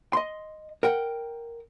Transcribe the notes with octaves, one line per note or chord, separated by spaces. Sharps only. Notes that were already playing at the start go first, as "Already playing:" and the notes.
D#5 C6
A#4 F#5 G5